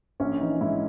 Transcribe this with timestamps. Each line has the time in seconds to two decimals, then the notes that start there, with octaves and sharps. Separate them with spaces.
0.20 A#1 C#4
0.41 E3 D#4
0.61 G#2 E4